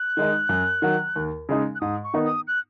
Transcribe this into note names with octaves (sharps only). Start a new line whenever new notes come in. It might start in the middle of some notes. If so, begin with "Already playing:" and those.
Already playing: F#6
D#3 G#3 D#4
F#2
D#3 F#3
D#2
C#3 G#3 D#4
F#6
G#2 D#6
C#6
D#3 B3 D#4
D#6
F#6